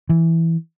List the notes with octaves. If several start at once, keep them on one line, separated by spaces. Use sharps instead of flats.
E3